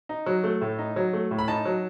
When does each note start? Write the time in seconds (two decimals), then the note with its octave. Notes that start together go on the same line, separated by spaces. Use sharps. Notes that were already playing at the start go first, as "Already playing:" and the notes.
0.09 D#4
0.26 F#3
0.44 A3
0.61 A2
0.79 D#4
0.96 F#3
1.13 A3
1.31 A2
1.39 B5
1.48 D#4 A5
1.65 F#3